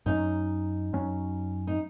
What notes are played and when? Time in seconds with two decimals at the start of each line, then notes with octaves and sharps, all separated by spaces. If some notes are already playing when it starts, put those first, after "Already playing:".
0.06 F#2 F#3 C#4 D#4
0.93 F#2 F#3 C#4
1.67 D#4